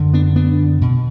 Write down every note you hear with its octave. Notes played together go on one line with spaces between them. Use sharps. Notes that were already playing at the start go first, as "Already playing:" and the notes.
Already playing: F#2 D3
B3 D4
B3 D4
B2